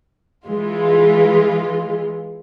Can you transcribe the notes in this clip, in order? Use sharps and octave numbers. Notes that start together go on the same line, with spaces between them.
E3 G#3 F4